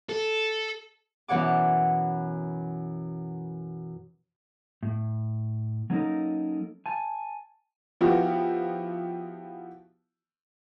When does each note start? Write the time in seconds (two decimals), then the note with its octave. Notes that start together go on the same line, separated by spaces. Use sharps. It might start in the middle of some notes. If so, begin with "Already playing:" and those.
0.09 A4
1.28 F#2 B2 E3 C#5 F#5 D6
4.83 A2
5.90 F#3 A#3 C#4 D#4 A4 A#4
6.86 G#5 A5
8.01 F3 B3 E4 F#4 G4